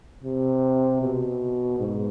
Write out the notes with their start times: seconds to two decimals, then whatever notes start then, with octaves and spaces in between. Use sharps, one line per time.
0.24 C3
1.01 B2
1.79 G#2